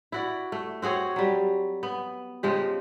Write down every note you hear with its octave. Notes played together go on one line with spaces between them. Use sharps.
E4 F#4 D5
A3
C4 F#4 G#4 C#5
F#3 G3
B3
C#3 F3 G#3 G4